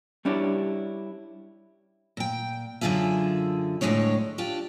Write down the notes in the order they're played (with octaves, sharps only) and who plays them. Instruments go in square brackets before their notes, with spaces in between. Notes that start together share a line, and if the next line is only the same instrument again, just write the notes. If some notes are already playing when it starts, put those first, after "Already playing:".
[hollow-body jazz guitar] G3 C#4 D4 E4 G4
[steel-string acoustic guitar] A#2 G5
F#2 D3 D#3 F4 G#4 E5
D2 A2 D#3 G#3 D4 C#5
D4 F4 G4